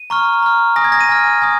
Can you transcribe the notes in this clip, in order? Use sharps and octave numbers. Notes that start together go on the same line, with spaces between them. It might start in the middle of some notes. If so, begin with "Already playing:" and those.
Already playing: D#7
A#5 C#6 F6
A#5 F6
G#5 D#6 A#6
G#6
A#6
D#7
G#5 F6
G#5 D#6